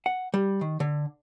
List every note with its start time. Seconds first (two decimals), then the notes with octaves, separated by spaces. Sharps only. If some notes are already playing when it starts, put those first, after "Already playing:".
0.06 F#5
0.34 G3
0.61 D#3
0.80 D3